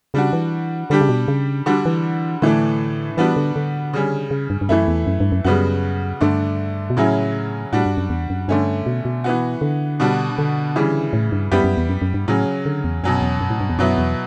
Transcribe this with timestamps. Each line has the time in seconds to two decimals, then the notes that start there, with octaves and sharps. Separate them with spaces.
0.14 C#3 G3 D4 F#4
0.33 E3
0.90 D3 G3 D4 G4
1.01 C#3
1.09 B2
1.28 C#3
1.66 D3 G3 D4 F#4
1.85 E3
2.42 A2 D3 E3 A3 D4
3.17 E3 G3 B3 D4 F#4
3.36 D3
3.56 D3
3.93 C#3 G3 C#4
4.31 C#3
4.50 G2
4.61 G2
4.69 F#2 E3 A3 E4
4.88 E2
5.07 F#2
5.20 G2
5.32 F#2
5.44 F#2 C#3 G3 B3 F#4
6.20 G2 D3 A3 D4
6.90 B2
6.97 A2 C#3 F#3 C#4 E4
7.73 A2 G3 D4 F#4
7.86 G2
7.97 F#2
8.10 E2
8.30 F#2
8.48 G2 D3 A3 C#4
8.86 B2
9.05 B2
9.24 E3 B3 F#4
9.61 D3
10.00 B2 G3 D4 F#4
10.38 D3
10.76 C#3 E3 G3
11.13 A2
11.32 G2
11.51 F#2 G3 B3 E4 G4
11.64 F#2
11.77 E2
11.90 F#2
12.02 F#2
12.14 G2
12.28 A2 C#3 F#3 C#4
12.66 D3
12.84 E2
13.04 F#2 B2 F#3 C#4
13.22 E2
13.41 F#2
13.50 A2
13.60 G2
13.70 E2
13.79 F#2 B2 F#3 B3 E4
13.98 E2